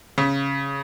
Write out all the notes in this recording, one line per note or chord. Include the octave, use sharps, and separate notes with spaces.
C#3